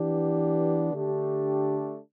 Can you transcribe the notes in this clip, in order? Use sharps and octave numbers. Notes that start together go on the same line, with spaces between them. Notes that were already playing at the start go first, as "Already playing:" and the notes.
Already playing: E3 B3 D4 G4
D3 A3 D4 G4